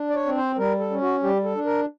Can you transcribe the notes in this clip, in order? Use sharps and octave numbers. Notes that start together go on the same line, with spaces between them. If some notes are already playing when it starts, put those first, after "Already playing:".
Already playing: D4
D5
C#5
C4
C5
G3 A#4
A4
C#4
F#4
G3 G4
A4
D4
A#4